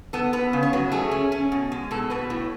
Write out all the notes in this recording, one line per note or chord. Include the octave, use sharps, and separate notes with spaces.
B3 A4
B3 B4
C#3
C#5
F#3 B4
A3 G#4
C#4
C#4
B2
G#3
B2 A4
B2 B4
A2